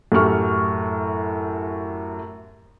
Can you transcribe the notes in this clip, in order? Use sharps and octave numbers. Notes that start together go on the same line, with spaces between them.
F#2 A2 G4 C#6 F6